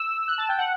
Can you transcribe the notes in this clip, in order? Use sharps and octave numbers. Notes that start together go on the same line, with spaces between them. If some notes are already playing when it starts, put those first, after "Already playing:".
Already playing: E6
F#6
A5
G5
F#5